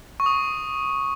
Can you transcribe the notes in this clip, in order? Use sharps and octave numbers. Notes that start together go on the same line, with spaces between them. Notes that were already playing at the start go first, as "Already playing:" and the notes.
C#6
D#6